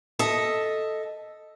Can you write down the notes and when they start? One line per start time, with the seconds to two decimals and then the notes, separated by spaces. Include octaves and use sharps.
0.19 A4 D#5 E5